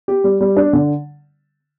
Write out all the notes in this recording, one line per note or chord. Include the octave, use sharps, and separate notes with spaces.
G4
G3
G3
D4
D3